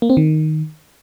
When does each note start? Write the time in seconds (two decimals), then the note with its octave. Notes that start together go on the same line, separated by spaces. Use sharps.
0.02 A#3
0.10 C4
0.17 D#3